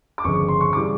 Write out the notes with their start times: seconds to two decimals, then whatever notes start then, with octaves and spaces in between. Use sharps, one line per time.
0.18 D6
0.24 G1 F2 C#3 C#6
0.48 C6
0.61 C#6
0.73 C#3 E3 G3 D6